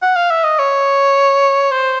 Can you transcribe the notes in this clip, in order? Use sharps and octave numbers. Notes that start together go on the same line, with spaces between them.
F#5
F5
E5
D#5
C#5
C5